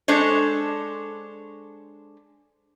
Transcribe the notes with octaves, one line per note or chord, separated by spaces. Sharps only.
G#3 D4 A4 C5 C#5